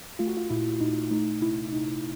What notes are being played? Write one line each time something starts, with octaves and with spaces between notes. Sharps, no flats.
A3 F4
F#4
F4
A#2 E4
A#2 D#4
A3 D#4
C3 E4
C3 D#4